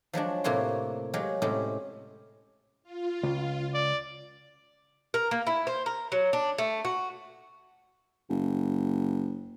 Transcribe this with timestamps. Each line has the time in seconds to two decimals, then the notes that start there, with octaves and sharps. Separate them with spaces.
0.13 F3 F#3 G#3 D4
0.44 A2 C3 A#3 F#4 C#5 C6
1.14 F#3 G#3 G4 F5
1.42 A2 C3 G#3 C#4 G4
2.83 F4
3.23 C#2
3.74 D5
5.14 A#4
5.31 A#3
5.47 E4
5.67 C5
5.86 A#4
6.12 F#3
6.33 D4
6.58 A3
6.85 F#4
8.29 F#1